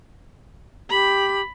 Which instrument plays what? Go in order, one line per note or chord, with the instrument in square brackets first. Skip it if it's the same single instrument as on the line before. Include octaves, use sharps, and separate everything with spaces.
[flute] G4 [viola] B5